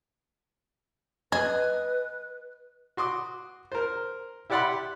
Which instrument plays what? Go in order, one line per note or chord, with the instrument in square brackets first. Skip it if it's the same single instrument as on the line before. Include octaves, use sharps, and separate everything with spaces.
[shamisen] G#4 [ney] B4 [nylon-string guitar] D#5
[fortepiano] F#4 C6 D6 D#6
A#4 C5
E4 G4 D5 F#5 B5 C6